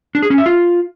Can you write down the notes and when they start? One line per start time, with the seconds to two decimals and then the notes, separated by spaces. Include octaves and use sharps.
0.15 D4
0.23 G#4
0.30 C#4
0.38 E5
0.46 F4